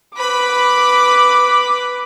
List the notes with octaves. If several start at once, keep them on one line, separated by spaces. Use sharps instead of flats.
B4 B5 D6